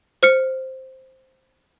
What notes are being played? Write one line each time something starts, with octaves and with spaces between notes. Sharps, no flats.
C5 F6 C#7